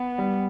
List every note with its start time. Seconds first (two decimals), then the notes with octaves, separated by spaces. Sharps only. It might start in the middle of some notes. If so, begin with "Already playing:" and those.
Already playing: B3
0.18 G3